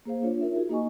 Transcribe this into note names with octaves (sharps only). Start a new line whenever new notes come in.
A#3 G#4 C5 F5
D4 F4 C#5
D#4 F4 A#4 E5
F#4 G#4
A#3 D#4 D#5 G#5 C#6